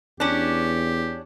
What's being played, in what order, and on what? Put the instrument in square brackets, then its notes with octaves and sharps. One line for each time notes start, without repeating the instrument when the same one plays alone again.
[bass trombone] E2 [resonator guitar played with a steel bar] C#4 D4 [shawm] G4